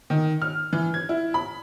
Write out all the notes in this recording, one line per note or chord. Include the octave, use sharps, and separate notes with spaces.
D#3
F6
E3
G#6
E4
B5